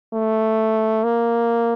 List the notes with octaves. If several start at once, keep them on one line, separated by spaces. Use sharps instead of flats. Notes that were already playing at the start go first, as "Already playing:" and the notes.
A3
A#3